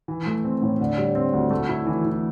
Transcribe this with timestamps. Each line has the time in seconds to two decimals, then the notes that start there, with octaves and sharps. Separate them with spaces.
0.08 E3
0.26 A3
0.44 C4
0.62 A2
0.81 D3
0.97 G3
1.15 C4
1.33 D2
1.51 A3
1.69 E4
1.87 E3
2.05 E3